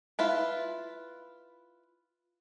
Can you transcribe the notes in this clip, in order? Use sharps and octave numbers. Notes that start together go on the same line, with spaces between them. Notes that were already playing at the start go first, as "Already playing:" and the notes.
E4 F4 B4